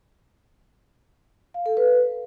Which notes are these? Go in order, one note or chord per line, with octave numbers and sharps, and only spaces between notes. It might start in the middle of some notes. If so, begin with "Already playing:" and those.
F5
A4
B4